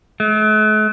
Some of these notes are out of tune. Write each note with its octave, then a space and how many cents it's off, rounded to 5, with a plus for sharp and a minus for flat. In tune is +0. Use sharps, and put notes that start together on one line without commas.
A3 -45